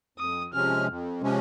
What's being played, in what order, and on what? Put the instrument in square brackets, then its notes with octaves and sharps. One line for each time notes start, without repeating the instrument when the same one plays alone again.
[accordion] F2 [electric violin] D#6
[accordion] C3 F3 G#3 C#4 [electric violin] F6
[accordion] F2
C3 F3 G#3 C#4